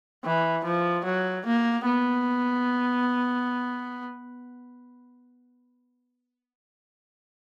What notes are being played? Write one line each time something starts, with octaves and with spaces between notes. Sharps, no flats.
E3
F3
F#3
A#3
B3